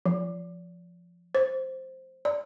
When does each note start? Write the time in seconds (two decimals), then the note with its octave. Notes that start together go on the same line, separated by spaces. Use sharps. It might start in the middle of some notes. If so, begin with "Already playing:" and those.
0.06 F3
1.35 C5
2.25 D5